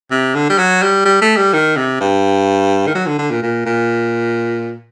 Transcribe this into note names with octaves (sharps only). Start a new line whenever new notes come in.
C3
D3
G3
F#3
G3
G3
A3
G3
D#3
C3
G2
D#3
F#3
D3
D3
A#2
A#2
A#2